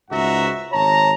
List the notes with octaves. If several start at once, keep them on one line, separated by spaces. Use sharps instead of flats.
C#2 G#2 F#4 E5 F#5 A#5
G#1 C#5 A5 A#5